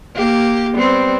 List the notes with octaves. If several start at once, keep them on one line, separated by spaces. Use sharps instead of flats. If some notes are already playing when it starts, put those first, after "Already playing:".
A#3 G4
G3 B3 C4